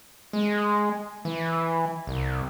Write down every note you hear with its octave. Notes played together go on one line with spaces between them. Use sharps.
G#3
E3
C2